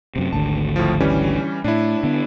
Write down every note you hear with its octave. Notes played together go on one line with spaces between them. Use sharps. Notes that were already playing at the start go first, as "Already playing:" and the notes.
F#2 C3
G#1 D2 D3 A5
A2 F3
E3 G3 C#4
A2 D4 E4
D3 B3